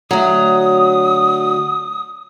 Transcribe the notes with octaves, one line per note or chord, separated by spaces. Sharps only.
D2 F#3 D#6